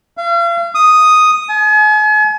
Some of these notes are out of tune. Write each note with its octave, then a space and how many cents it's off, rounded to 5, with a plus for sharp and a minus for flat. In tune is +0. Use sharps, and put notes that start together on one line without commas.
F5 -40
D#6 +0
G#5 +40